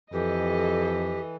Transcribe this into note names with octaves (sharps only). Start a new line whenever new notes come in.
F2 E3 G4 A4 D#5